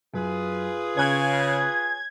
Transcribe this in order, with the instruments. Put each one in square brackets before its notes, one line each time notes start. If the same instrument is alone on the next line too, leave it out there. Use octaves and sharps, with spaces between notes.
[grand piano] F#2 [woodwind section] F4 G#4 B4
[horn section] C#3 [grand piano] C#5 G#5 F#6 [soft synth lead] G#6